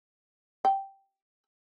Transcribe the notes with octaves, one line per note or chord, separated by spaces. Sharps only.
G5